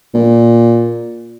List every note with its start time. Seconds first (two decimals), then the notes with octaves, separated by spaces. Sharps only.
0.14 A#2